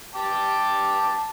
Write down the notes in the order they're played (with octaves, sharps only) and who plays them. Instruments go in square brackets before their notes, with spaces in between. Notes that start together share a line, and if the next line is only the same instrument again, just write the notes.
[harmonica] G5 A5 D6